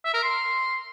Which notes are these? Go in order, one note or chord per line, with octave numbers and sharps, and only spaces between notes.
E5
A#4
C6